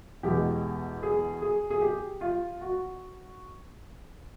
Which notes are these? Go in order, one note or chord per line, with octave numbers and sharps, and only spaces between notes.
E2 B2 G#3 G4
G#4
G#4
G#4
G4
F4
F#4